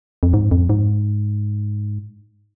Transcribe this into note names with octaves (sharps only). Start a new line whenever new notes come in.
F2
G#2
F2
G#2